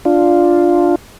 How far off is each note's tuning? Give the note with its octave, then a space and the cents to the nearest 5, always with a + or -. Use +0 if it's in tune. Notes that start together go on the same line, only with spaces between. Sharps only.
D4 +0 F4 +0